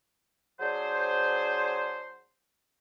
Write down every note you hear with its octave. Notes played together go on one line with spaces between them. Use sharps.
F#3 D4 G#4 C5